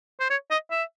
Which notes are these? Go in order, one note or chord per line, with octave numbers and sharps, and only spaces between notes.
C5
C#5
D#5
E5